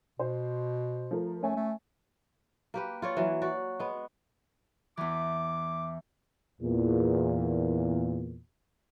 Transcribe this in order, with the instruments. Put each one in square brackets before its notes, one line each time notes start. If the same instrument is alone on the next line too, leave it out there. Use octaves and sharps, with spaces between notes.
[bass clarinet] B2 [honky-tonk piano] C5
[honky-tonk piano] F3 A3 A#4
[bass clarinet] A3 [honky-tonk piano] C#4 G#5
[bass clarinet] A3
[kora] A#3 G4 B4
F4 C#5 D5
E3 F#3
F#4 D5
G#3 B3
[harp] E2 E3 [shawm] D6
[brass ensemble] E2 A#2